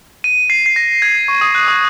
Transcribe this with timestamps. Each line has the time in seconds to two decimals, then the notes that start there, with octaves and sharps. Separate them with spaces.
0.24 D#7
0.50 C7
0.66 C7
0.76 A#6
1.02 G#6
1.28 C#6
1.41 D#6
1.55 F#6
1.68 D#6